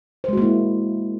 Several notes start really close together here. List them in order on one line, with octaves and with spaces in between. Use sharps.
C5 G#3 F#4 A#3 E4